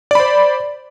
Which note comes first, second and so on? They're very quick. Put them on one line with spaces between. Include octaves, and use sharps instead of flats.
D5 B5 C5